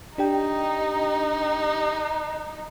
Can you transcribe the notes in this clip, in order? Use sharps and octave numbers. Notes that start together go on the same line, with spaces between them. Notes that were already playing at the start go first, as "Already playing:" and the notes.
D4 D#4 G4 G5